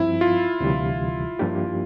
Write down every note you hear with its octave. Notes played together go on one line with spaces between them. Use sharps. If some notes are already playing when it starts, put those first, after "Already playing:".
Already playing: G2 F3 C4 E4
F4
D2 C3 E3 G3
G2 F3 A#3 D4 G4